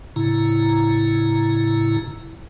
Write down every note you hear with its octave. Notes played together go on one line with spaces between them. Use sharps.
A2 C#3 E4 A#5